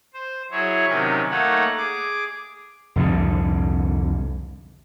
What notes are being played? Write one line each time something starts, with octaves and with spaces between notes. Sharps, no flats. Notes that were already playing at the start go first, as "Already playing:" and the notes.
C5
F#3 E4 G#4 C#5
C3 D#3 F#3 C#4
A3 A#3 D#4 C#5 F#5
G#4 D6
C2 F2 G#2 D3